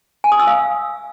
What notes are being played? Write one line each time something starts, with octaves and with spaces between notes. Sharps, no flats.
G#5
D#6
E6
F5